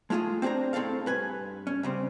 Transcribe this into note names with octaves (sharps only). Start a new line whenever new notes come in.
G#3 A3 F4 F#4 G#4
C4 D4 G#4 C5 A#5
A2 C4 G#4 A4 F5
G2 B4 G#5
C#4
C#3 G3 C4